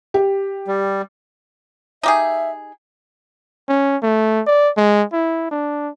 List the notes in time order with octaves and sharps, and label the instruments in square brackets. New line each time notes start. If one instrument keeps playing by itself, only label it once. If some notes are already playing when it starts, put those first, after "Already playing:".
[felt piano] G4
[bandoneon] G3
[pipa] D#4 G4 G#4 [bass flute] E5
[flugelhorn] C#4
A3
D5
G#3
E4
D4